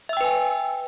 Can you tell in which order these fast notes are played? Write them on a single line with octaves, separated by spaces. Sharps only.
E5 E6 G5 B4 G#5